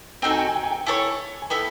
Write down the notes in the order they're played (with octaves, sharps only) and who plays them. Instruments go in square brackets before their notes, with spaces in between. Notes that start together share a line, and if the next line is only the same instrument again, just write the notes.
[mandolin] C4 D#4 F#4 A4 [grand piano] G5
[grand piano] G#5
G5
G#5
G5
G#5
G5
[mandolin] E4 A4 C#5 [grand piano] G#5
[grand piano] G#5
[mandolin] B3 E4 A4 [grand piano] G5